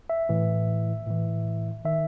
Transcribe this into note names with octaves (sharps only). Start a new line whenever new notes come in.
E5
A2 E3
A2 E3
D#3 E5